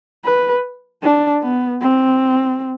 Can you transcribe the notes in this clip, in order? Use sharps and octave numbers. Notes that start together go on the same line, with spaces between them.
B4
D4
B3
C4